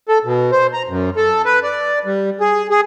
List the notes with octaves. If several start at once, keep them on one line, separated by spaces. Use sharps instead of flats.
A4
B2
C5
A#5
F#2
A4
B4
D5
G3
G#4
G#4